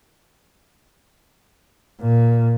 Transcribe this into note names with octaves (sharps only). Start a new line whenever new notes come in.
A#2